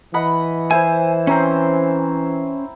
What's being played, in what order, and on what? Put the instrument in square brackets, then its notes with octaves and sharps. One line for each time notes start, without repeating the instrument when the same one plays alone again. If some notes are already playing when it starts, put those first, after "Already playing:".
[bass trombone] E3 [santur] D#5 F#5 B5
[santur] E4 C5 [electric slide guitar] G#5
[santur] C4 A#5 C6 [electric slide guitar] C#4 C5